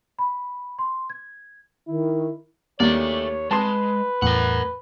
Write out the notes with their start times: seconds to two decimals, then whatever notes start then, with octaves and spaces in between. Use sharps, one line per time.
0.19 B5
0.79 C6
1.10 G#6
1.87 D#3 E4
2.80 D#2 A3 C#5 D5
3.51 G#3 B4 A5 C6
4.22 E2 A2 A#4 F#5